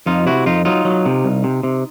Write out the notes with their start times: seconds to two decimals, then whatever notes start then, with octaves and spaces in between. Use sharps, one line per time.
0.06 F2 D#4 F4
0.26 C3 E4 F#4
0.46 F2 D#4 F4
0.65 F#3 D#4 F4
0.85 F#3
1.06 C3
1.25 C2
1.44 C3
1.63 C3